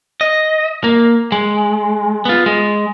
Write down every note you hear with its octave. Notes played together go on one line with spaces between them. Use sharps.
D#5
A#3
G#3
B3 F4
G#3